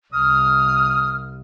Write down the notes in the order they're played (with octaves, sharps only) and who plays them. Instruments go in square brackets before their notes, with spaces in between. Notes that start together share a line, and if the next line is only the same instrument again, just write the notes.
[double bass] C2 [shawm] D#6 [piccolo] F6